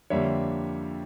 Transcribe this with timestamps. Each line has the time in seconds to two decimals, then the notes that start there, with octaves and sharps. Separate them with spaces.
0.10 F2 D3 G3 A#3 C#5 E5